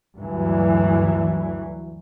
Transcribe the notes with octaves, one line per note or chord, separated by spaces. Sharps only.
D2 G2 E3 F#3